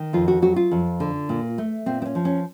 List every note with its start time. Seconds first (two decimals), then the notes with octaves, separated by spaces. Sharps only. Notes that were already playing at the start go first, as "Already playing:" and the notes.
Already playing: D#3
0.13 F2 F4
0.28 F#4
0.42 F#3 F#4
0.56 F4
0.71 F2
1.00 D3
1.29 A#2
1.58 A3
1.86 A#2 C4
2.02 C4
2.06 C#4
2.15 F3
2.25 C#4